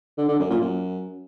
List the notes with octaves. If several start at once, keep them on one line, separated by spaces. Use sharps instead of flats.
D3
D3
F#2
A#2
F#2